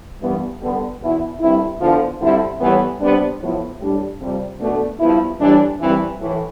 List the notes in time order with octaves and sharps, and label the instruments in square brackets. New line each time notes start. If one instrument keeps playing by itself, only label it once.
[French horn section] G2 E3 B3
D3 G3 B3
E2 B2 B3 E4
G2 D3 G3 C4 E4
E2 D3 F3
D3 G3 C4 E4
A2 E3 G3 B3
C3 G3 B3 D4
A2 F3 B3 E4
A2 G3 D4
F2 C3 G3
B2 A3 D4
G2 F3 B3 E4
A2 E3 G3 D4
G2 E3 G3 C4 E4
A2 E3